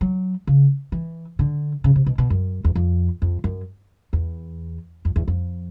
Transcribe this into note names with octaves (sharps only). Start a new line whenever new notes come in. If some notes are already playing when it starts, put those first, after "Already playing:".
F#3
C#3
E3
D3
C#3
C3
B2
B2
F#2
E2
F2
F2
F#2
E2
F2
E2
F2